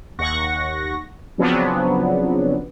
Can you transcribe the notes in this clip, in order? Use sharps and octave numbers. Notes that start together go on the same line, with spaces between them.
D#2 F#5 C#6 A#6
C#3 F3 F#3 B3 C4 D4